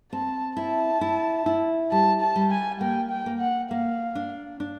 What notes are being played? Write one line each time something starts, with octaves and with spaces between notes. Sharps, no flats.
C4 A5
E4 A5
E4
E4
G3 A5
A5
G3
G#5
A#3 G5
G5
A#3
F#5
A#3 F5
D4
D4